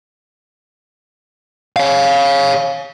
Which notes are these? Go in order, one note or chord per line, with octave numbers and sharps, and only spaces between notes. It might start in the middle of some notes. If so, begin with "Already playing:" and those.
C#5 F5